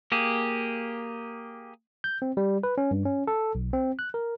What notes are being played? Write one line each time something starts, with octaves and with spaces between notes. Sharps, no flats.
A#3 G4 G#4
G6
C4
G3
B4
C#4
G2
C#4
A4
B1
C4
F#6
A#4